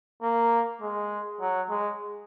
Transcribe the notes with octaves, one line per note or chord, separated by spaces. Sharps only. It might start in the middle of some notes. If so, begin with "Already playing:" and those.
A#3
G#3
F#3
G#3